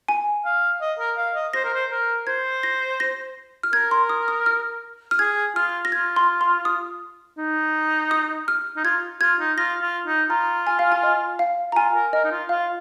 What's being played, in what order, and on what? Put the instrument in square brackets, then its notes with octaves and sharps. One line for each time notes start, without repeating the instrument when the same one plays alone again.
[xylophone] G#5
[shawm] F5
D#5
A#4
F5
D#5
[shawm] C5 [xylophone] A#6
[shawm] A#4
C5
A#4
[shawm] C5 [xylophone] G#6
[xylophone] A#6
A#6
F6
[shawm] A#4 [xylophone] G#6
[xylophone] C6
D#6
D#6
F6
F6
[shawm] G#4 [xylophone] G#6
[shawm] F4 [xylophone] F6
[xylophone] A#6
[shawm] F4 [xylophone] G#6
[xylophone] C6
C6
D#6
[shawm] D#4
[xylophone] D#6
F6
[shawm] D#4
[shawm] F4 [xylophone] G#6
[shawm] F4 [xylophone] G#6
[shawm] D#4
[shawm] F4 [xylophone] A#6
[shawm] F4
D#4
[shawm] F4 [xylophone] A#5
[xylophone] G#5
F5
G#5
D#5
F5
A#5
[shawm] F4 [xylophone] G#5
[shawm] A#4
[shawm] A#4 [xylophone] D#5
[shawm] D#4
F4
[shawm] F4 [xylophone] F5